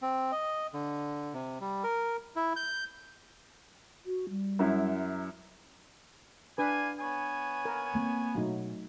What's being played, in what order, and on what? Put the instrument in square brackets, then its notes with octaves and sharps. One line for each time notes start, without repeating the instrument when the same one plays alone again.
[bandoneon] C4
D#5
D3
C3
G3
A#4
E4
G6
[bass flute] F#4
G3
[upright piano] F#2 F#3 E4
[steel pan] D4 B4 [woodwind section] D5 F5 G#5
[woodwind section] B3 C#5 G#5
[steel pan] A#4
[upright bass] A#3 C4
[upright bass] B2 [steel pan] F#3 A3 D#4